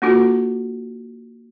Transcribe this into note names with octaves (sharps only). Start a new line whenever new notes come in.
A#3 D4 F4 F#4 A4